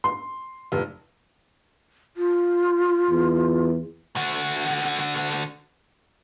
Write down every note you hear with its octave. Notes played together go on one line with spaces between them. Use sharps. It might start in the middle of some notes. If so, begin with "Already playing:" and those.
C6
F1
F4
E2
D3 F#4